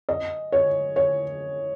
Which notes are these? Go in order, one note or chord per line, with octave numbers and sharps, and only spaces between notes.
D#5
C#5
C#5